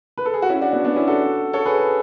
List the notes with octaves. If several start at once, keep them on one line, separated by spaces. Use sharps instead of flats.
B4
A4
G#4
F#4
C#4 E4
D4 F#4
B3 D4
B3 D4
C#4 E4
F#4 A4
A4 C#5
G#4 B4